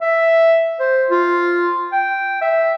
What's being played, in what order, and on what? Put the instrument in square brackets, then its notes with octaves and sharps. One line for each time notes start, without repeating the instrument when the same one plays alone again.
[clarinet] E5
C5
F4
G5
E5